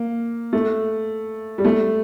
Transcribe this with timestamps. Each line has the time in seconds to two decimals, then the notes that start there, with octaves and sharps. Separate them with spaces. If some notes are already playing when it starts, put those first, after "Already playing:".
Already playing: A#3
0.53 A3
1.58 G3
1.65 A3